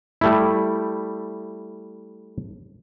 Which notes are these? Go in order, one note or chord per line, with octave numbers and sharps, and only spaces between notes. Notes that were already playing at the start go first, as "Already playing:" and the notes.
G3 A3 E4